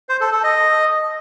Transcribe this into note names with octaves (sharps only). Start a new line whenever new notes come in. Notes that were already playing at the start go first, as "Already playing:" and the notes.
C5
A4
A4
D#5